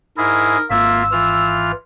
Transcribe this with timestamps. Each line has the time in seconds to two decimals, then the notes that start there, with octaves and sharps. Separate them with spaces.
0.18 G#2 E4 G#4 A#4
0.70 G#1 A#3 F4 E5 E6
1.12 E3 F4 F6